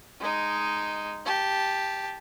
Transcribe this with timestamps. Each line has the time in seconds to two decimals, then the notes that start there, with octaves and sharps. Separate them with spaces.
0.20 G#3 D#4
1.25 G4 A5